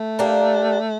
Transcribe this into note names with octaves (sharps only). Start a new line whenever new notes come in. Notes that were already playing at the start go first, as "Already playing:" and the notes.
Already playing: A3
A#3 D4 G4